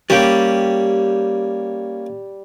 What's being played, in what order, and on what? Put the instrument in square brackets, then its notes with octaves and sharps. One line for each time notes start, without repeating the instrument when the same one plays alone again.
[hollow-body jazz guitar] G3 G4 [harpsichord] A#3 C#4